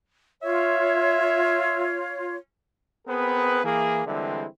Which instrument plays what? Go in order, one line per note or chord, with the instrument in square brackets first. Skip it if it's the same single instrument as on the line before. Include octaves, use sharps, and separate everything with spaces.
[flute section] F4 C#5 [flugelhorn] E5
[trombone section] B3 C4 G#4 A#4 B4
E3 A#3 G#4
D3 E3 G3 G#3 C4 E4